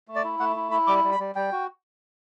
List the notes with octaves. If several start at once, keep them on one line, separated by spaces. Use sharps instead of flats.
A3
D5
E4
A3 F#5
E4
E4 B5
G3 D6
G3
B5
G3
G3 G5
F#4